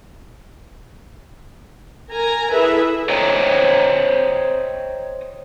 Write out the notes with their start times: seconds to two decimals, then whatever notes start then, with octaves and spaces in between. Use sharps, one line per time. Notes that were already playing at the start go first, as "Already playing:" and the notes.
2.09 A#4 G#5 A#5
2.53 E4 G#4 A4 B4 E5
3.10 C5 C#5 D#5 G5 A#5